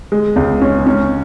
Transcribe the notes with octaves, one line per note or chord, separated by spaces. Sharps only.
G#3
C#2
C#4
C#4